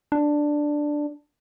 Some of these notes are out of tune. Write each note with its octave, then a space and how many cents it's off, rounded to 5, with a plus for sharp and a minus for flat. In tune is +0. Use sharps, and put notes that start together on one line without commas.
D4 +5